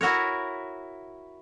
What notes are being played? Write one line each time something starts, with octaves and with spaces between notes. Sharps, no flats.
E4 F#4 A#4 C#5